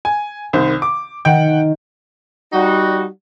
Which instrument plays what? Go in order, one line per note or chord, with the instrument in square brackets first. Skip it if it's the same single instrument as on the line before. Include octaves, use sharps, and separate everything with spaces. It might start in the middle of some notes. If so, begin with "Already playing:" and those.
[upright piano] G#5
C2 D#3 C5
D6
[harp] D#3 [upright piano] F#5 G5
[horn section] G3 D#4 F#4